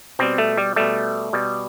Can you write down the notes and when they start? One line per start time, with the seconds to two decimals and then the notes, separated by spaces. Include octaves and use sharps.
0.19 B2 G3 C4
0.38 A3
0.57 G3
0.76 B2 G3 A3
1.33 B2 G3